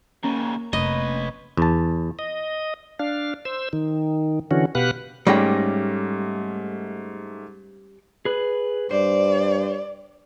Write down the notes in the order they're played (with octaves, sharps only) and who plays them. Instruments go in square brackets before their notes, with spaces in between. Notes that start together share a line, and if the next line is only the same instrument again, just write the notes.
[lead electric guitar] D#2 C#3 [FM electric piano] A#3 C#4 A#5
[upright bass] F1 [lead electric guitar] B4 C#5 [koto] D#5
[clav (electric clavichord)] E2 A5
[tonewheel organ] D#5
D4 F5
C5 E6
D#3
D3 E3 C#4 F#4
B2 G4 B4 F5 F#5 F#6
[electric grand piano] G#2 A3 A#6 [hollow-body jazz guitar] G3 [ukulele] C#4 G#4 G5
[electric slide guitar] G#4 B4
[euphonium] G2 [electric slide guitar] C5 [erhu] D5